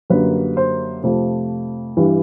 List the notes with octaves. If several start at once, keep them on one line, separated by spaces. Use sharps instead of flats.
F#2 D3 G3 A#3 B4
C5
F2 C3 F3 A3
G2 E3 G3